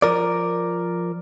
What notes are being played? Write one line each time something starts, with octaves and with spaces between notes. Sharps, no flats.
F3 A#4 D5